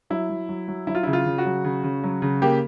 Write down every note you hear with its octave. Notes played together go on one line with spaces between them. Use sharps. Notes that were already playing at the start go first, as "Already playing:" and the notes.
F#3 E4
F#3
F#3
F#3
F#3 E4
F4
C#3 E4
F4
C#3
F#4
F#3
C#3
C#3
F#3
C#3
A#3 G4